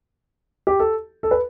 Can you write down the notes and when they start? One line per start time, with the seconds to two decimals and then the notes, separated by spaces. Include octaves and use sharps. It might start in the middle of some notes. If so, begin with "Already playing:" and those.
0.67 G4
0.80 A4
1.23 A4
1.31 B4